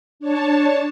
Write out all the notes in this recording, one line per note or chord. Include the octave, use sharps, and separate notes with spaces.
D4 C#5 A5